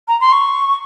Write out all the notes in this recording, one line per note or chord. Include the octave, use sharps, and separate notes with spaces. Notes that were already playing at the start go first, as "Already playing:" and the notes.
A#5
C6
C#6